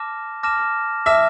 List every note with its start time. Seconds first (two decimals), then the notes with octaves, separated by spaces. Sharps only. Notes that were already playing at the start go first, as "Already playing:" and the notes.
Already playing: A5 D6 F6 A#6 E7
0.43 A5 D6 F6 A#6 E7
1.06 E5 A5 D6 F6 A#6 E7